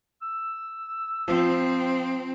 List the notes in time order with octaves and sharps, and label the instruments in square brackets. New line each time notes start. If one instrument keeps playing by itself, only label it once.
[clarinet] E6
[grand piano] F3 [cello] C4